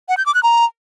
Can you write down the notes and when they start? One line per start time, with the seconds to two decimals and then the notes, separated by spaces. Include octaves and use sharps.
0.09 F#5
0.17 G6
0.26 D6
0.35 F#6
0.43 A#5